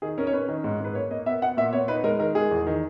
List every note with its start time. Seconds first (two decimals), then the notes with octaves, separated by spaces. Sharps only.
0.02 D#3 G#4
0.18 C#4 A#4
0.27 C#5
0.33 C#4 B4
0.48 D#3
0.64 G#2
0.80 G#2 B4
0.95 A#3 C#5
1.11 A#3 D#5
1.26 B3 E5
1.42 B3 F#5
1.57 A#2 E5
1.73 B3 C#5
1.88 D#4 B4
2.04 G#3 A#4
2.19 D#3 A#4
2.35 G#3 G#4
2.51 E2
2.67 D#3